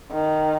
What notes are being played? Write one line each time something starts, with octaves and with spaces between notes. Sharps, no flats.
D#3